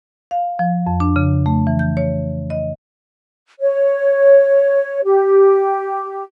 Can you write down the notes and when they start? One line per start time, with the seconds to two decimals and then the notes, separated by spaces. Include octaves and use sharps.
0.31 F5
0.59 F3
0.87 F2
1.00 D4
1.16 C#3
1.46 A3
1.67 E3
1.79 G6
1.97 C#5
2.50 D#5
3.60 C#5
5.04 G4